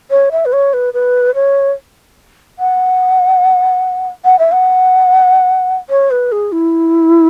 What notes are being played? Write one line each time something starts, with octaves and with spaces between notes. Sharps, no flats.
C#5
E5
B4
C#5
B4
B4
C#5
F#5
F#5
E5
F#5
C#5
B4
G#4
E4